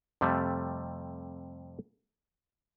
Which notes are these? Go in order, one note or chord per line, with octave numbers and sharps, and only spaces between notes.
F2 C3 G3 A3